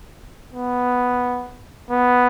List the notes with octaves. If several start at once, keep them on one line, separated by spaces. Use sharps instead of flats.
B3
B3